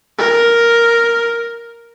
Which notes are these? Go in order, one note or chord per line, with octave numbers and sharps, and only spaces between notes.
A#4